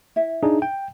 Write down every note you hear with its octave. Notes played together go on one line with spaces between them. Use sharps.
E4 E5
D4 D#4 G#4
G5